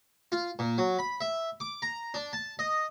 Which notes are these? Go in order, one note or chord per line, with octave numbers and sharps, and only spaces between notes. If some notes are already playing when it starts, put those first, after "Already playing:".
F4
A#2
F#3
B5
E5
D6
A#5
D4
A5
D#5